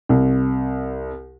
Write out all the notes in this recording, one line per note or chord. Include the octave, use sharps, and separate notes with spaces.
C2